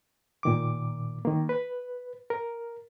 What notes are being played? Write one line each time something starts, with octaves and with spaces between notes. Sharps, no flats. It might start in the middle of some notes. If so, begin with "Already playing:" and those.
A#2 D#3 D6
D#3 A#3
B4
A#4